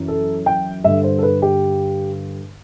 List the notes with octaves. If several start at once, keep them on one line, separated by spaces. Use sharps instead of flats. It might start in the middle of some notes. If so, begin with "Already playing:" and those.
Already playing: F#2 E3
A4
G5
G2 D3 E5
C5
A4
B4
G4